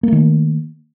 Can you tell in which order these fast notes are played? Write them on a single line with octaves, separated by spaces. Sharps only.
A#3 A3 D#3